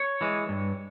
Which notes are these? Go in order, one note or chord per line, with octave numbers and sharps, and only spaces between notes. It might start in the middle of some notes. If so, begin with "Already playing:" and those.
Already playing: C#5
E3 G#3
G2